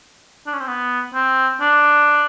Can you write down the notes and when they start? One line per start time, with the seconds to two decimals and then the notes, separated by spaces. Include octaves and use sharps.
0.47 D4
0.54 C#4
0.61 C4
0.67 B3
1.14 C4
1.61 D4